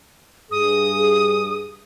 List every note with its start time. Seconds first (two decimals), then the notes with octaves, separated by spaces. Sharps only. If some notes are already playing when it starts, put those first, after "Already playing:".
0.51 G2 G#4 D#6